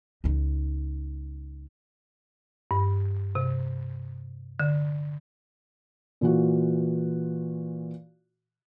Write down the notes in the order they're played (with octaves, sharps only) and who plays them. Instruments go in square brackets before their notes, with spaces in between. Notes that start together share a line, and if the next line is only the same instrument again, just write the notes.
[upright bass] C#2 D#4
[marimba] G2
C3
D3
[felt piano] A#2 E3 F4 F#4